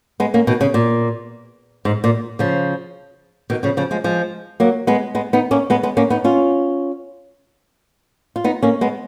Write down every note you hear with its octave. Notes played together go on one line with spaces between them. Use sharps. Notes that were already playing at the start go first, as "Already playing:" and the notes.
G#3 B3
A#3 C#4
B2 D#3
C#3
A#2
G#2
A#2
C#3 F3
B2 D#3
C#3 F3
C#3 F3
F3 G#3
F3 G#3
F#3 A#3
G#3 B3
G#3 B3
B3 D#4
A#3 C#4
G#3 B3
G#3 B3
A#3 C#4
B3 D#4
C#4 F4
F4
B3 D#4
A#3 C#4
G#3 B3